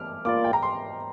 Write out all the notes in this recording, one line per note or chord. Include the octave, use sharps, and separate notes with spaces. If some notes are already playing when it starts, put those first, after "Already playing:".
Already playing: D6 F6
A#3 F4 D5 D6
G5
A#5
C6